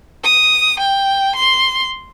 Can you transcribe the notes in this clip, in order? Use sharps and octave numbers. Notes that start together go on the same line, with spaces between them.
D#6
G5
C6